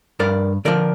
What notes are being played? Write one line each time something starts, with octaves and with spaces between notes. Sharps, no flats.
G2 A#4 D5
D3 F3 A#4 D5